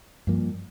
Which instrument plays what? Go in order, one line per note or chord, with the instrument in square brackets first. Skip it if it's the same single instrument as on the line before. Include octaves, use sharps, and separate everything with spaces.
[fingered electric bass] G2 F3 A#3